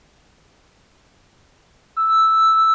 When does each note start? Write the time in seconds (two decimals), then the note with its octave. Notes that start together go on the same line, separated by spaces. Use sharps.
1.97 E6